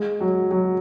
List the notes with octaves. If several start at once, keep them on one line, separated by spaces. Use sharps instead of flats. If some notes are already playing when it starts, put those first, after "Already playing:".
Already playing: G#3
F#3
F#3